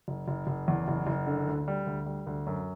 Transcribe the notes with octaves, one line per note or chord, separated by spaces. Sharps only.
F#1
F#1
F#1
E2
F#1
F#1
D3
D2
G3
D2
G3
D2
F#2